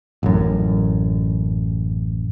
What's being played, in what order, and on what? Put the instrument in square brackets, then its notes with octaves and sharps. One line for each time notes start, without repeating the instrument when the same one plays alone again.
[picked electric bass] A1 F#2